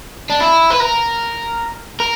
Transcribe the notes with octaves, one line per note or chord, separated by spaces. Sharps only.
D4
E4
B4
A#4
A#4